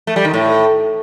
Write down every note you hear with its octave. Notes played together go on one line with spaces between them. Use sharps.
A3
G3
D#3
A2